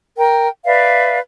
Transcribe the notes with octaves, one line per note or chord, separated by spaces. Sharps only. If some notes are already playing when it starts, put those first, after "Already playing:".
A#4 G5
B4 D5 E5 F5